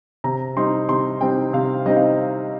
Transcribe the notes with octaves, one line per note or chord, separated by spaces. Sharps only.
C3 A#5
G3 C4 D#4 C6
C3 C6
G3 C4 D#4 G5
C3 F5
G3 C4 D#4 D#5
F5